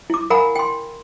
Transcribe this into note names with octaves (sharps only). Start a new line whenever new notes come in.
E4 D6
A#4 F5 F#5 G#5 A#5 B5
G5 C6